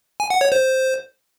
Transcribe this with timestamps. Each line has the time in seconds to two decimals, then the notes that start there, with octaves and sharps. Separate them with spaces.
0.20 G#5
0.30 F#5
0.41 C#5
0.52 C5